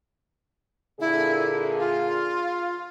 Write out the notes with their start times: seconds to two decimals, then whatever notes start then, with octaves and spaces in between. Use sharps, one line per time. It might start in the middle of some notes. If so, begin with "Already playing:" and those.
1.00 A#2 D3 E4 G#4
1.78 F4